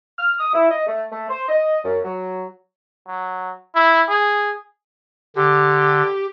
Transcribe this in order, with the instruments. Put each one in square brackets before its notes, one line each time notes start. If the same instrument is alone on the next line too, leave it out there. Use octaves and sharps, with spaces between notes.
[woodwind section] F6
D#6
E4
D#5
A3
A3
C5
D#5
F#2
F#3
[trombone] F#3
E4
G#4
[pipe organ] D3 [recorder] G4